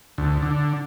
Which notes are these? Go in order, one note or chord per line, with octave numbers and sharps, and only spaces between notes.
D2
D3